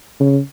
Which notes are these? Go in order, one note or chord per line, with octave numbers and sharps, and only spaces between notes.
C#3